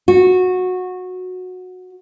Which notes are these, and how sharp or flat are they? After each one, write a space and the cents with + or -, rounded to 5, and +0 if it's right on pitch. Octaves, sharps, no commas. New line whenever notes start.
F#4 -15